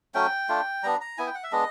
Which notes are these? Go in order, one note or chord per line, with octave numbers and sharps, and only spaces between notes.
F#3 A3 C#4 G5
A3 D4 F4
G3 B3 D4 A#5
A#5
B3 E4 G#5
G5
F#5
E5
G#3 B3 D4 D#5